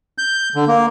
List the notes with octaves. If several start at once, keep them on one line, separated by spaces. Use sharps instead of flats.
G6
D3
A#3